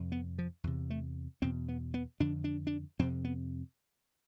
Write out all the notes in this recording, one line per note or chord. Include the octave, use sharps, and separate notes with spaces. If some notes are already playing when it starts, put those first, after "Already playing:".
Already playing: F2 C3
B3
F3
E2 C3
A3
E2 B2 C4
B3
B3
F2 D3 D4
D4
D4
F2 C3 C4
B3